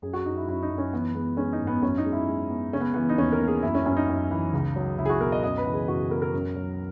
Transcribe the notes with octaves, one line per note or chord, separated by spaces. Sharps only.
F#2 G#4
F#4
F#2 D#4
E4
F#2 E4
D#4
F#2
C#4
E3 B3
G#3 B3
G#3 C#4
D#4
G#2
B3
F#2 C#4
D#4
G#3
E4
G#3
B3
C#3 C#4
B3
E3 B3
D#4
D#2 C#4
A#4
A#3
G#4
F#2 E4
C#4
F#2 C#4
D#4
F#2
E3
C#2
F#3
C#2 E4
G#4
F#4
B2 A#4
D#5
F#2 D#5
B4
E3
G#4
F#2 F#4
G#4
B3 A#4
A#4
F#2
F#3